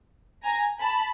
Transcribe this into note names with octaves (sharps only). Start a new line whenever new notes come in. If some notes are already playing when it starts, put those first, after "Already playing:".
G#5 A#5
A5 B5